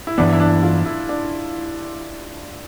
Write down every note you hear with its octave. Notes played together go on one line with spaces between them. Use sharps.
E4
G2 E3 B3 D4
E4
D4
F4
E4
D4